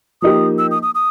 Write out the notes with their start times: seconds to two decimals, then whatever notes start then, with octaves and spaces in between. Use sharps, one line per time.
0.22 F3 A#3 D#4 G4 D#6
0.58 E6
0.71 D#6
0.83 D#6
0.95 D#6